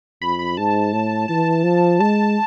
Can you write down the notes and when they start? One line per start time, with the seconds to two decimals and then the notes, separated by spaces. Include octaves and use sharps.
0.22 F2 B5
0.39 B5
0.57 G#2 A5
0.93 A2
1.28 E3 A5
1.64 F3
2.00 G#3 A5